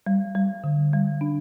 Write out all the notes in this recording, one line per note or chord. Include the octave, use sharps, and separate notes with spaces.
G3
G3
D3
G3
D4